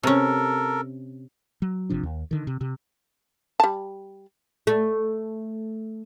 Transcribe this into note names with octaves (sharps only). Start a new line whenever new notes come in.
C3 C#4 A4 A#4
F#3
F#1 C3 F3 D4
D#2
D3 D#3
C3
C3
G3 A5
A3